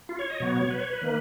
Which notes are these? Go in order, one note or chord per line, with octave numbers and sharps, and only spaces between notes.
F4
C#5
D#5
B2 F#3 B3 C#5
C#5
B4
C#5
B4
D#3 A#3